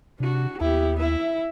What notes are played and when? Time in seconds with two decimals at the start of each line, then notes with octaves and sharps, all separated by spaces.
0.20 C3 D4 F#4
0.61 D#2 B3 E4 G4
1.00 E4 E5